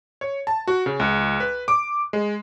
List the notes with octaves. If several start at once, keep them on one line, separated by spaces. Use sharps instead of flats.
C#5
A5
F#4
C#3
C#2
B4
D6
G#3